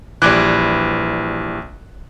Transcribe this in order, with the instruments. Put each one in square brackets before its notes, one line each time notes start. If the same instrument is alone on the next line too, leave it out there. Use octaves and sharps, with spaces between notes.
[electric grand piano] A#1 D6 F#6 [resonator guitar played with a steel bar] E3 G3